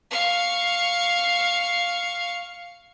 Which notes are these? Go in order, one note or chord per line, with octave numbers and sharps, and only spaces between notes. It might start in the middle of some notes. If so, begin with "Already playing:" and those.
F5 C#6